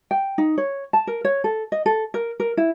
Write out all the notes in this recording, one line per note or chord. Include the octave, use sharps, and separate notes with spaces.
G5
D#4
C#5
A5
A#4
C#5
A4
D#5
A4
A#4
A#4
E4